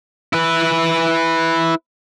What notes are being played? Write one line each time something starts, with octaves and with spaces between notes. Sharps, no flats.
E4 B4